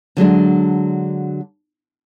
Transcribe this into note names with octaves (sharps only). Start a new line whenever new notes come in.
D3 F#3 G#3 D4